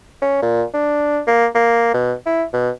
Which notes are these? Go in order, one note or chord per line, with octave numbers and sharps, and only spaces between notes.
C#4
A#2
D4
A#3
A#3
B2
E4
B2